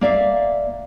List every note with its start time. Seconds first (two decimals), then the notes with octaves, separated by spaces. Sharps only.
0.01 A#3 D5 E5 F5